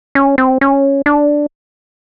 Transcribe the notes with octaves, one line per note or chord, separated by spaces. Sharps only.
C#4
C4
C#4
D4